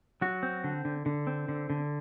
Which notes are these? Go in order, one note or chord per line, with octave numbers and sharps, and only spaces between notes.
F#3 F#4
C4
D3
D3
D3
C4
D3
D3